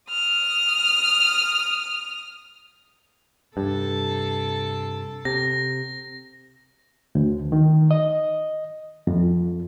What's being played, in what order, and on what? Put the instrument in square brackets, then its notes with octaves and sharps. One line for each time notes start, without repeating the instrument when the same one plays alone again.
[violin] D#6 F6
[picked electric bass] G2 [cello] C3 A4
[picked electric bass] C3 [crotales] A#6
[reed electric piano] D2
D#3
D#5
F2